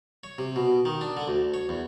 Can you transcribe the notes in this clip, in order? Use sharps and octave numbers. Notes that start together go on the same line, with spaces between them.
C#5
C3
B2
D#3
D4
D3
D2
C#5
E2